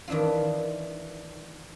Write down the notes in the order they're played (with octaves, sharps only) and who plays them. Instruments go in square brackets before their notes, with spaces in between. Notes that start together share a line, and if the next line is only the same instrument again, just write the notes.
[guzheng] D#3 E3 D4 E4 F4